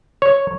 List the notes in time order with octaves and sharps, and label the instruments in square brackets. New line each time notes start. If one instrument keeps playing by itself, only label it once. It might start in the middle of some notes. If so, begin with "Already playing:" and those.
[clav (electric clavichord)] C#5